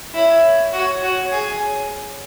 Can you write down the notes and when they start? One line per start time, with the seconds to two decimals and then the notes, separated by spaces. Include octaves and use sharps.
0.14 E4 C#5
0.73 F#4
1.03 F#4
1.32 G#4